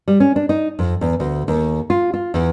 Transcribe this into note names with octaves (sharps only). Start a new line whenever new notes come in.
G3
C#4
D4
D#4
F2
E2
D2
D#2
F4
F4
E2